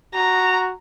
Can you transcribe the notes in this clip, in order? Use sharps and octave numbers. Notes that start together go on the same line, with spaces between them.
F#4 A#5